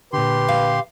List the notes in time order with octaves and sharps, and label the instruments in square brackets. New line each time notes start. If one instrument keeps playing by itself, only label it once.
[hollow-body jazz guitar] A#2 D3 [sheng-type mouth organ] G4 C6 [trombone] B4
[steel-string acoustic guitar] F5